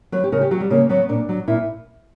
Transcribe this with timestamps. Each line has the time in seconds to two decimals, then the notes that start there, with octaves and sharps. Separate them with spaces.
0.12 F#3 B4
0.24 G4
0.32 C#3 A#4
0.41 G4
0.51 F#3 F#4
0.60 G3
0.70 C#3 A#3
0.89 F#3 B3
1.09 A#2 D4
1.29 F#3
1.48 A#2 E4